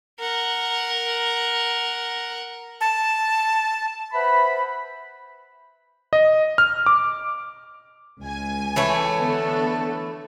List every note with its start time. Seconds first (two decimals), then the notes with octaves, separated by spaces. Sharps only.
0.19 A#4 F#5
2.81 A5
4.13 B4 C5 E5 F#5 B5
6.13 D#5
6.58 F6
6.86 D6
8.20 C#2 G#5
8.76 E3 A3 C#5
9.20 D3 B3 A4